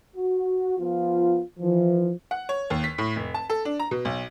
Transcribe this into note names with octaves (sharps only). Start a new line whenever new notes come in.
F#4
F3 B3 F4
E3 F3
F#5
C#5
D#2
B6
A2
F1
A5
A4
D4
A#5
B2
B1